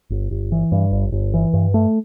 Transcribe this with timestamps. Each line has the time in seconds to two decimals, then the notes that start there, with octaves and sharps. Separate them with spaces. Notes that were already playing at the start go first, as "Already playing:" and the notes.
0.10 G1
0.31 G1
0.52 E3
0.72 G2
0.92 G1
1.12 G1
1.34 E3
1.54 G2
1.74 A3